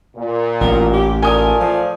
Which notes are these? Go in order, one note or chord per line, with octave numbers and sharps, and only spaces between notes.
A#2
A1 A#4
G4
A3 F4 A#4 D5 G#5 D#6
F3